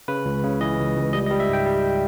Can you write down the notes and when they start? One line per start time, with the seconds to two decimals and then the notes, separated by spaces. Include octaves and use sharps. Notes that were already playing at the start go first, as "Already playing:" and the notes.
0.08 C#3 B4
0.25 C#2
0.43 C#3
0.61 E3 D#5
0.78 C#2
0.96 C#2
1.13 G3 D#5
1.26 D#5
1.31 G3
1.40 E5
1.49 G#2 G5
1.66 G3